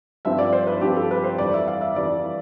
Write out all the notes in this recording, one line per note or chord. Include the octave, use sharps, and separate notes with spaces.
G2 F3 C4 E5
D5
C5
B4
G2 F3 C4 G4
A4
B4
C5
F2 E3 G3 D5
E5
F5
E5
F2 E3 G3 D5